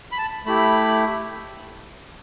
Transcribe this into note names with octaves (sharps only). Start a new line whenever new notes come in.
B5
A5
A3 E4 G4 B5